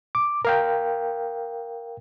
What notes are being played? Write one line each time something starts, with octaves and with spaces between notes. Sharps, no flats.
D6
A#4 F5 G5